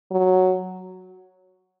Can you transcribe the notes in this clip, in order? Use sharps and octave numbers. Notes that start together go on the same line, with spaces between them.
F#3